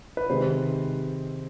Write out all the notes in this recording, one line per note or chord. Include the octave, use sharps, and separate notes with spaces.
B4
C3 D#3 G#3 C5